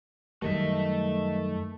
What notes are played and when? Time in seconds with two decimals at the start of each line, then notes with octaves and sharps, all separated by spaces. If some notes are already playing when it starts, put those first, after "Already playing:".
0.42 F#2 D#3 G3 A3 A#4 D#5 E5